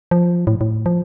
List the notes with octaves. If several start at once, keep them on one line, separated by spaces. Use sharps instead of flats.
F3
A2
A2
F3